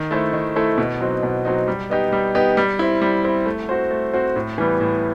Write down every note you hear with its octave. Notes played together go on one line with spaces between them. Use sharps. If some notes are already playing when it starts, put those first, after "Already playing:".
Already playing: D#3
A3 E4 A4 C5
D#3
A3 E4 A4 C5
B2
F#3 C4 D#4
B2
F#3 C4 D#4
G3
B3 D#4 G4
G3
B3 D#4 G4
G3
C4 E4
G3
C4 E4
A3
C4 F#4 C5
A3
C4 F#4 C5
A2
E3 G3 B3
A2